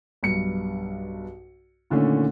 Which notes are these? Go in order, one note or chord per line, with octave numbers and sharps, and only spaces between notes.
B1 G2 C#7
A#2 D3 D#3 A3 C#4